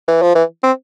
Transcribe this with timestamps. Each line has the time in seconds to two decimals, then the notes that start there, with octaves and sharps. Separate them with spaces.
0.08 E3
0.22 F3
0.35 E3
0.63 C4